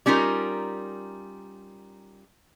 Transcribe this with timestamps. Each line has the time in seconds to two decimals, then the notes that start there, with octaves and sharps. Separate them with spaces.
0.06 G3 C#4 D#4 F4 A#4